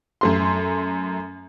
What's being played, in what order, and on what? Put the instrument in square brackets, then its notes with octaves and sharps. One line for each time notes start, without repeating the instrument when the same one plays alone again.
[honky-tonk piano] F#2 A3 C6